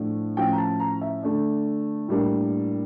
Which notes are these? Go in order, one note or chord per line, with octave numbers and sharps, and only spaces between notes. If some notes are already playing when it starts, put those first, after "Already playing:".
Already playing: A2 F3 A3 D4
A2 F3 C#4 G5
A#5
A5
A#5
E5
D3 A3 D4
A2 G3 A#3 D4